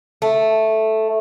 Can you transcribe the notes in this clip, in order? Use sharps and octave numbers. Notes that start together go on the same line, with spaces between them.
A3